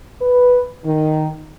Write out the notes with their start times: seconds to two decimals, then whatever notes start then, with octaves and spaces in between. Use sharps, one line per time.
0.22 B4
0.85 D#3